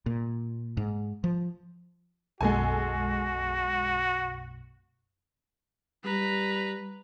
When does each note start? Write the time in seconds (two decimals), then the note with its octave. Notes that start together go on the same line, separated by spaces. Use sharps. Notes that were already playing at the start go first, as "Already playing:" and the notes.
0.06 A#2
0.77 G#2
1.24 F3
2.41 B1 F#2 B2 G#3 F#4 A4 G#5
6.05 G3 B4 A#5